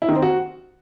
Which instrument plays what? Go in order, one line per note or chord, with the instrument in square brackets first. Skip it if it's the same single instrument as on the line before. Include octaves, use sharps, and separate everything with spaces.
[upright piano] E4
D#3
C4
F#4